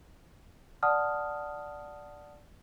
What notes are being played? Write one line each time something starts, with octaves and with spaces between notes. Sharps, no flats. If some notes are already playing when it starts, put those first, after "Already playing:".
D5 F#5 A5 D#6 F6